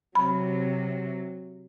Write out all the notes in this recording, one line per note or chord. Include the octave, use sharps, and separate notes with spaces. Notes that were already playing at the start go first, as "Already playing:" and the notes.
C3 F#3 B5